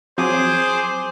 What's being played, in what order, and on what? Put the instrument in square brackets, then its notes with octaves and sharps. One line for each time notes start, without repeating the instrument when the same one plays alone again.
[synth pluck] F3 F#3 C4 [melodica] G#4 D6 D#6 [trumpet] C5